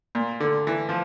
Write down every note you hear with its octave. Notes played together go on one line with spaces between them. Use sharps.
A#2
D3
E3
F3